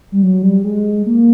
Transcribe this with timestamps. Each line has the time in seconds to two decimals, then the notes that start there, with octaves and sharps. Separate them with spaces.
0.12 G3
0.23 F#3
0.43 G3
0.64 G#3
1.06 A#3